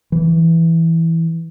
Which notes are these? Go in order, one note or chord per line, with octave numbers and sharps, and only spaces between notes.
E3